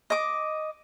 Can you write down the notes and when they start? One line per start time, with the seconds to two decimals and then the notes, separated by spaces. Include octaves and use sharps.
0.10 D#5 D6